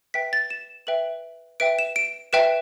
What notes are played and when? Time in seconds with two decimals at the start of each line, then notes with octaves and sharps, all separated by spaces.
0.14 B4 E5 G5 B6
0.33 A6
0.50 E7
0.87 B4 E5 G5 F#7
1.60 B4 E5 G5 D7
1.79 E7
1.96 D7
2.33 B4 E5 G5 E7